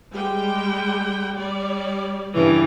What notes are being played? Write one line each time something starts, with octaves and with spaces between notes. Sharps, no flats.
G3 G#3 G5
G3 D5
G2 C#3 E3